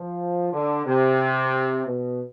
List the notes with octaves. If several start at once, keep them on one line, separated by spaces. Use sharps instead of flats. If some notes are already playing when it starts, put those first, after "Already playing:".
Already playing: F3
D3
C3
B2